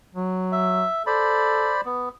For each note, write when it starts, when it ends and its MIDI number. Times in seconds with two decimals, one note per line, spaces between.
0.15 0.85 54
0.52 1.03 76
1.07 1.73 69
1.07 1.81 72
1.07 1.81 74
1.07 1.81 83
1.85 2.09 59